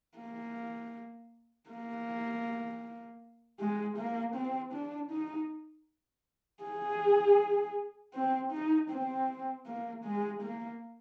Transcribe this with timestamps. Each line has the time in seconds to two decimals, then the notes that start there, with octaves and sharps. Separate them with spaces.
0.18 A#3
1.70 A#3
3.60 G#3
3.97 A#3
4.35 C4
4.73 D4
5.11 D#4
6.63 G#4
8.14 C4
8.52 D#4
8.90 C4
9.66 A#3
10.04 G#3
10.42 A#3